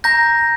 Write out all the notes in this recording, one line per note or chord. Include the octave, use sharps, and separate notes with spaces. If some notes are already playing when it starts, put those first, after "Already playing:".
A#5 G6 A#6